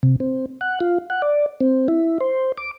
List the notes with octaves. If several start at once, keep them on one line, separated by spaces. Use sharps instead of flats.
C3
C4
F#5
F4
F#5
D5
C4
E4
C5
D6